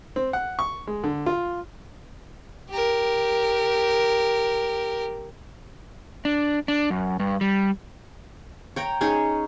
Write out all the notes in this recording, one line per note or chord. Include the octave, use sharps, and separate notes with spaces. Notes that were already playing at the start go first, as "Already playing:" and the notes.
C4
F#5
C#6
G#3
D3
F4
G4 A#4
D4
D4
F#2
G2
G3
C#5 G5 A#5
C#4 D#4 G#4 C#5